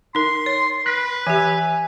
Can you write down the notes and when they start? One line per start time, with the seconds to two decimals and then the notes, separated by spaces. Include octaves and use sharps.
0.15 D#4 A#4 C6
0.46 C#5
0.86 B4 F#6 B6
1.27 E3 G4 E5 G#5